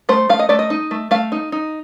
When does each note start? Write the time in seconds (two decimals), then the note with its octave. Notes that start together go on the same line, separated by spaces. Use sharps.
0.09 A3 C5
0.29 A3 F5
0.39 D#5
0.49 A3 D5
0.59 D#5
0.70 D#4
0.91 A3
1.11 A3 F5
1.32 D#4
1.52 D#4